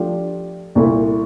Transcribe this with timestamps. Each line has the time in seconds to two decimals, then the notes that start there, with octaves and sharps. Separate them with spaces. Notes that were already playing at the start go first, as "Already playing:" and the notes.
Already playing: F3 A3 D4 G4
0.75 C2 A#2 A3 E4